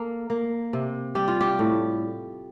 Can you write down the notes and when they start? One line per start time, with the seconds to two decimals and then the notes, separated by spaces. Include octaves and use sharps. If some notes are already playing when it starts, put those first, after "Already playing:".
Already playing: A#3 A4
0.30 A#3
0.73 C3
1.15 G3 G4
1.28 F4
1.41 G4
1.59 A2